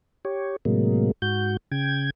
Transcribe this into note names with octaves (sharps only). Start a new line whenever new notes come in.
G4 C#5
A2 C3 F#3 G#3 A#3
G#2 F#4 G6
C#3 G5 G#6